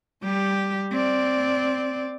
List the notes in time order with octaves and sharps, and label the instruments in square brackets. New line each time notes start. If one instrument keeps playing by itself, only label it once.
[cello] G3 G4
C4 D5